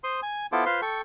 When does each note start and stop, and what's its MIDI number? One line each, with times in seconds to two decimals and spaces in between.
0.04 0.20 72
0.04 0.20 84
0.04 0.20 87
0.23 0.46 80
0.52 0.65 59
0.52 0.65 64
0.52 0.65 65
0.52 0.65 69
0.52 0.65 72
0.52 0.65 86
0.66 0.81 65
0.66 0.81 71
0.66 0.81 72
0.66 0.81 77
0.66 0.81 84
0.82 1.01 69
0.82 1.01 79
0.82 1.01 85